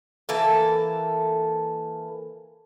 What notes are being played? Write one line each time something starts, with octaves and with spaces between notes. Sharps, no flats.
E3 A#3 A4